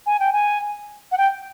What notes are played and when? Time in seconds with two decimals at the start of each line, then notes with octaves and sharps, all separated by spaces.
0.06 G#5
0.20 G5
0.33 G#5
1.12 F#5
1.18 G5